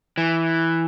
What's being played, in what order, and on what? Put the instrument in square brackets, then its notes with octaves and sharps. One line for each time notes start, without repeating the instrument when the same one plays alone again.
[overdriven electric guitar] E3